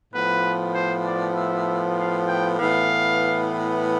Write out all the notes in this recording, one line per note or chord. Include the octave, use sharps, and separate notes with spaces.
A2 F3 B3 B4
C5
D5
E5
F5
G5
A2 E3 B3 F5